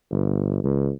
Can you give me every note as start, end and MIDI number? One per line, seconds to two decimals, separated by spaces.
0.12 0.63 31
0.64 0.91 37